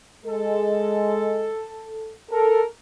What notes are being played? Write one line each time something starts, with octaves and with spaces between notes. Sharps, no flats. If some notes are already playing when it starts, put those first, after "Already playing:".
G#3 A4
A4 A#4